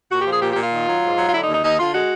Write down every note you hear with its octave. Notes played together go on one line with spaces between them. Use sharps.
A#2 F#4
G4
F3 G#4
A#2 G4
A#2 G4
F4
D#3
F#3
G#2
F#3
F4
D3 E4
D#4
D#2
D#4
D#2 D#4
D3 F4
G#3 F#4